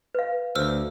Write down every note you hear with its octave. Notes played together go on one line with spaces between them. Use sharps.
B4 F5
D2 C5 E6 F6